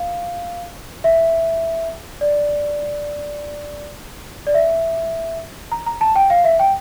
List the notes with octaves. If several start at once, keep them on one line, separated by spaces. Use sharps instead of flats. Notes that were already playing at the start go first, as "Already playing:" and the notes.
Already playing: F5
E5
D5
D5
E5
A#5
A#5
A5
G5
F5
E5
G5